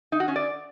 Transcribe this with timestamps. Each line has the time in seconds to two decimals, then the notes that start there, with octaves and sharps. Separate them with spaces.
0.12 D#4
0.20 F#4
0.28 C#4
0.36 D5